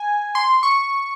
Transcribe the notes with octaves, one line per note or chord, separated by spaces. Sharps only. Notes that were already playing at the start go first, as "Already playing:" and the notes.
Already playing: G#5
C6
C#6